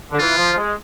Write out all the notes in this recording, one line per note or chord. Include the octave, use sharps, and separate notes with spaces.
D3
E3 F4
F3
F3
G#3